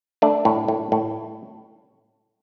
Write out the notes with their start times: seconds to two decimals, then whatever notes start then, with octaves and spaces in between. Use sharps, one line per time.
0.22 A3 D4
0.45 A2
0.68 A2
0.92 A2